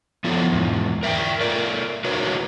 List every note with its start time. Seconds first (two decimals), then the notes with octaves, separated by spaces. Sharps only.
0.24 F3 B3 E4 A4 C#5
0.52 E2 G#2
1.03 A#4 E5 F5 G5
1.40 A3 A#4 D5
2.04 E4 F#4 A#4 B4 C#5